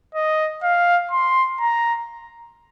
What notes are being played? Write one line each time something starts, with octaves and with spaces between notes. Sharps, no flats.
D#5
F5
C6
A#5